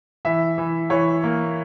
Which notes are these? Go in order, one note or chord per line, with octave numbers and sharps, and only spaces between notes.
E3 E5
E3
E3 C#5
A#3